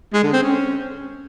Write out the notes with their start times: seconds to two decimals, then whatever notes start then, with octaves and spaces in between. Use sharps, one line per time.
0.13 G#3
0.23 D3
0.33 C4
0.43 C#4